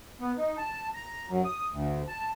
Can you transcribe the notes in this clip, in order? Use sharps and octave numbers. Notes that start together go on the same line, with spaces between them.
B3
D#4
A5
A#5
F#2
D#6
D2
A5